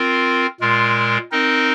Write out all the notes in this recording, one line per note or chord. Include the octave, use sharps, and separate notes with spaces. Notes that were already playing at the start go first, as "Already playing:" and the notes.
Already playing: C4 F4 A#4
A#2 G#3 F4 A#4
C4 D#4 A#4 D#5